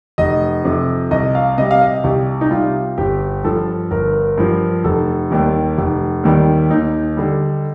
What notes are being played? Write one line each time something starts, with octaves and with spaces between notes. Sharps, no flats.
F1 D#5
F2 C3
C2 D#5
F5
C3 G3 D#5
F5
D#5
C2 G4
D#4
C3 G3 F4
G1 G4
G2 F3 A4
G1 A#4
G2 F3
F1 A4
D#2 D#3 G3
F1
D#2 D#3 G3
D#2 D#4
D3 G3